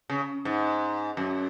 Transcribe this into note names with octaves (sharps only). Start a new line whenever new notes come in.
C#3
G#2
F#2